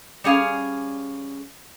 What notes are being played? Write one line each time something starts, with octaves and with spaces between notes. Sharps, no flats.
G3 C#4 G#4 F5